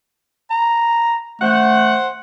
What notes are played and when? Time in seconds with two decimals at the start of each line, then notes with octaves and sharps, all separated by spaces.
0.50 A#5
1.41 A3 C5 F#5